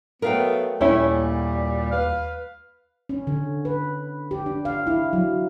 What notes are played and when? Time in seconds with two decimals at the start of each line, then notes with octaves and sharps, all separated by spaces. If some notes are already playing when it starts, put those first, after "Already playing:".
0.22 F#3 A3 B3 A#4 F5 G5
0.81 D#2 A#2 G3 A3 C#4 E4
1.91 B4 F5
3.09 C#4
3.27 D3
3.65 B4
4.31 G4
4.46 D4
4.65 F5
4.87 E4
5.13 F#3